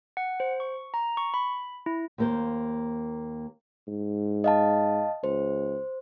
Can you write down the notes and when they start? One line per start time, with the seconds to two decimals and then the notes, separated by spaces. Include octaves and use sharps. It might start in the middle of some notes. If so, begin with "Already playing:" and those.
0.17 F#5
0.40 C5
0.60 C#6
0.94 A#5
1.17 C#6
1.34 B5
1.86 E4
2.18 D#2 A#3 C5
3.88 G#2
4.44 D#5 F5 A5
5.24 C#2 C5